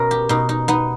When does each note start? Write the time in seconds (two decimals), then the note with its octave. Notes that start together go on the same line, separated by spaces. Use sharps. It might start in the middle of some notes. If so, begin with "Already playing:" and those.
Already playing: B2 C#4 A#4
0.11 G4
0.29 B2 D#4
0.49 D#4
0.68 B3 D#4